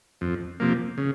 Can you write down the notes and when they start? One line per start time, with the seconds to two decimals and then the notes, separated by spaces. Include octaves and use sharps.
0.21 F2
0.60 C3 F3 A#3
0.98 C#3